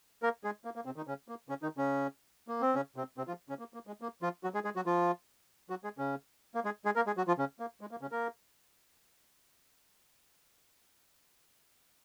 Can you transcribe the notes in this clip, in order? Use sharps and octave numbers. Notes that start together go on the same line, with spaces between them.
A#3 A#4
G#3 G#4
A#3
A#3
C3 C4
D#3 D#4
C#3 C#4
A#3
C#3 C#4
D#3 D#4
C#3 C#4
A#3
C4
C#3 C#4
C3 C4
C3 C4
F3 F4
C#3 C#4
A#3
A#3
G#3
A#3
F3 F4
F#3 F#4
G#3 G#4
G#3 G#4
F#3 F#4
F3 F4
F#3 F#4
G#3 G#4
C#3 C#4
A#3
G#3 G#4
G#3 G#4
A#3 A#4
G#3 G#4
F#3 F#4
F3 F4
C#3 C#4
A#3
G#3
A#3
C#3 C#4
A#3 A#4